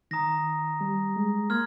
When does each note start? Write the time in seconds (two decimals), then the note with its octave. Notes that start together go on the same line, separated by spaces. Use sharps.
0.11 D#3 A#5 D#6 A#6
0.81 G3
1.16 G#3
1.50 A#3 C6 F6 G#6